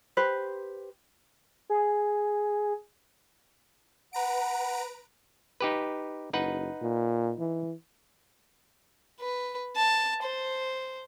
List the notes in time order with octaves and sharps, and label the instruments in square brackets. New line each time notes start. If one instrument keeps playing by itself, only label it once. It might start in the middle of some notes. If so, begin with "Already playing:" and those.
[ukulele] G4 B4 C5
[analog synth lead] G#4
[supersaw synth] B4 A#5 D7 [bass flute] F#5
[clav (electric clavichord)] D#4 G4 B4
[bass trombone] F#1 [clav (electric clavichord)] D#4 B4 F#5
[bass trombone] A#2
E3
[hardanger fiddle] B4
A5
C5